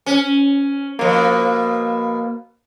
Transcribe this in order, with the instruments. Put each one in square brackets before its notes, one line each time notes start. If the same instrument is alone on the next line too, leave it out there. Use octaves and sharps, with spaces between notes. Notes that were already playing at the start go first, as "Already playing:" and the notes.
[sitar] C#4
[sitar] B2 F3 [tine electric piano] A#3